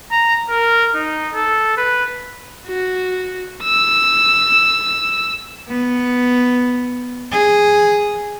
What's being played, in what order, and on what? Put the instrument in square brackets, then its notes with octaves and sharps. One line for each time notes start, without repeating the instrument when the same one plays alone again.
[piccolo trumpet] A#5
A#4
D#4
A4
B4
[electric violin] F#4
E6
[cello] B3
G#4